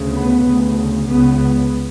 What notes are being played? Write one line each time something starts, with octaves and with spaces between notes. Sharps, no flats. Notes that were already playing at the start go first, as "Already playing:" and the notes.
Already playing: D2 C#3
B3
D2 C#3
C#2 C#3 B3